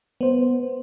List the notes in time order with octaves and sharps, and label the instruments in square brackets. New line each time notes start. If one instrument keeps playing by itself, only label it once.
[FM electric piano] B3 C5